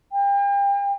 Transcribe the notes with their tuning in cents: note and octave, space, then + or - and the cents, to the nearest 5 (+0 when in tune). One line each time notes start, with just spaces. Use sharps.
G5 +40